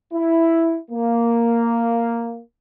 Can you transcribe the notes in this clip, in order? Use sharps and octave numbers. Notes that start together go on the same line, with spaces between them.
E4
A#3